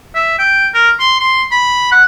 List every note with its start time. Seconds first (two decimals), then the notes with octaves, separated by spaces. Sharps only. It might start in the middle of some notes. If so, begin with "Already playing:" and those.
0.15 E5
0.38 G5
0.74 A#4
1.00 C6
1.19 C6
1.51 B5
1.91 F#5